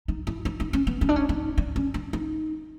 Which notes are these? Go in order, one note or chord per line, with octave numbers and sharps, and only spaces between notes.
D#4
E4
D#4
D#4
C#4
B3
C#4
D4
C#4
D#4
D4
C#4
D4
D#4